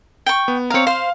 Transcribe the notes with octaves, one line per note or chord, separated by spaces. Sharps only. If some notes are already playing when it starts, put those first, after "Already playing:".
G5 C#6
B3
C4 C#5 F5 A#5
C5 F5